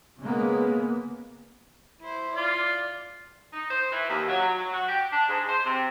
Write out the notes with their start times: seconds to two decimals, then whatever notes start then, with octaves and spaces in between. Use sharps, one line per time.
0.20 C#3 G#3 A#3 B3
2.00 E4 C5
2.36 F4 D5
3.53 D#4
3.69 C5
3.91 E3
4.08 D#2
4.27 F#3
4.56 F#3
4.72 F#4
4.87 G4
5.11 D4
5.28 G#2
5.48 C5
5.65 C3